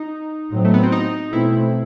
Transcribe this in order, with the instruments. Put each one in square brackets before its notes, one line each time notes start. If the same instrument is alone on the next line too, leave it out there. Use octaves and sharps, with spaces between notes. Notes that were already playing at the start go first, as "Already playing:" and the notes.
Already playing: [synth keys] D#4
[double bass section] A2 F#3 C4
[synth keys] A3
B3
C4
D#4
[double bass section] B2 A3 C4 [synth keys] E4